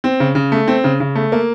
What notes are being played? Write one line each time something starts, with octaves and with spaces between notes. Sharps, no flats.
C4
C#3
C#3
A3
C4
C#3
C#3
A3
A#3